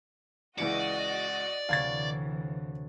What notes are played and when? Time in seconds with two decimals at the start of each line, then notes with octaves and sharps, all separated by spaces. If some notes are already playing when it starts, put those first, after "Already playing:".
0.58 C#2 E3 F#4 D5 D#5 C#7
1.69 D2 C3 E3 C#5 F5 G#6 A6